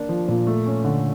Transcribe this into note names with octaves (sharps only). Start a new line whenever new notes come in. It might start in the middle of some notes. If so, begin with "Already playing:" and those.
Already playing: A#3 D4
F3
A#2
A3
C#4
D3